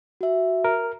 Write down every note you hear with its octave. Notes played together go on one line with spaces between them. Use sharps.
F#4 E5
A#4